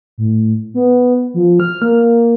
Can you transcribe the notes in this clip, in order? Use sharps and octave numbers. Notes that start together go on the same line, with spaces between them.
A2
B3
F3
F6
A#3